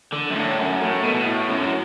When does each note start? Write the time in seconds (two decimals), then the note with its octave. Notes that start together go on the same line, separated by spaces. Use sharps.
0.13 D3
0.31 F#2
0.36 A2
0.58 F#2
0.81 A2
1.04 B2
1.14 B2
1.25 A2
1.48 F#2
1.62 F#3